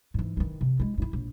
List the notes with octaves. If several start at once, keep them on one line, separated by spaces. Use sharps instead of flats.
G#2 E3
D#3 E3
C3
G#3 E4
G2 E4
A#1